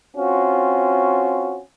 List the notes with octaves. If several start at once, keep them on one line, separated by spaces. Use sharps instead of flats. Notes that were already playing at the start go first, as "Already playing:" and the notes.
C4 C#4 F4 F#4